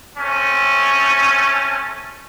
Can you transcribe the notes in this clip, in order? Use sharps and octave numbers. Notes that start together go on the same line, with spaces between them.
A3 C4 C#4